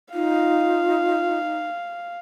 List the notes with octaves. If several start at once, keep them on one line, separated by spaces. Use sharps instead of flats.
D#4 F4 F5